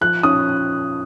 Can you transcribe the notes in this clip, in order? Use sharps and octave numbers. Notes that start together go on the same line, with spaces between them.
F3 F#6
C#4 D#6